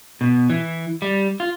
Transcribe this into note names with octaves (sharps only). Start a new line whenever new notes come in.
B2
E3
G3
F4